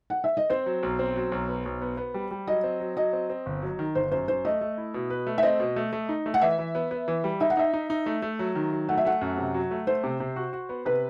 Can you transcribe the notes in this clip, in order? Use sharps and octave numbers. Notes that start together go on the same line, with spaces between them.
F#5
E5
D#5
C4 C5
F#3
B1
C4
F#3
B1
B3
B1
B3
B3
G3
G3
F#3 D#5
C4
F#3
F#3 D#5
C4
C4
G1
F#3
D#3
G1 C5
F#2 C5
F#2 C5
A3 D#5
A3
E4
B2
B4
A3
E5
C4 D#5
B2
A3
A3
D#4
A3
F#5
E3 E5
E3
B3
B3
E3
G3
D#4 E5
F#5
D#4 E5
D#4
D#4
A3
A3
F#3
D#3
F#3
A3 F#5
E5
A3 F#5
F#2
C3
F#3
A3
A3 C5
C3
C3
F#4
F#4
B3
C3 B4